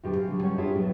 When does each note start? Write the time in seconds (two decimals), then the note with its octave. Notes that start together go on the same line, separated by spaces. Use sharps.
0.03 E2 A2 D3 F#3 G4 C5
0.16 C#3
0.29 D3 F#3 G4
0.42 G3 C#4 A4 C#5 F#5
0.58 D4 E4 F4 G4 G#4 C#5
0.74 A2 F#3 B3